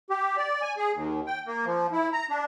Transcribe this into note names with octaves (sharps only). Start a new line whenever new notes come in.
G4
D5
G#5
G#4
D#2
G5
A#3
F3
E4
A#5
D4